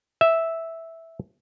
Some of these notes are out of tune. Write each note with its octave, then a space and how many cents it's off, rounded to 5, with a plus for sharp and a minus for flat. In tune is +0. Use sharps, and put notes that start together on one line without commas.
E5 -5